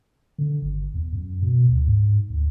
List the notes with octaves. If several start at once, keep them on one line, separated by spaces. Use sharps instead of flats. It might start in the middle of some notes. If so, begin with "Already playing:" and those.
D3
G1
E2
F#2
B2
D2
G#2
D2